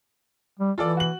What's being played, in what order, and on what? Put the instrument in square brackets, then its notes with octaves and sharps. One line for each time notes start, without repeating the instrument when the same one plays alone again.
[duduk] G3
[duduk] E3 [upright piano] F4 A4 D5
[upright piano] F#4 F#7